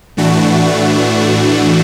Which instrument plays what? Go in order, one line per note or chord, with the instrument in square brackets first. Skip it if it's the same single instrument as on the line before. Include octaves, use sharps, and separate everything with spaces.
[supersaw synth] A2 E3 A3 D4 F#4